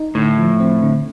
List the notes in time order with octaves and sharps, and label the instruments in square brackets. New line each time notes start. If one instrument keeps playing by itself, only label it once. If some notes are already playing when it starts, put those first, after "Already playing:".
Already playing: [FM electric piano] D#4
[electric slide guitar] A2 [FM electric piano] D3
[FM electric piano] F3
C4
D3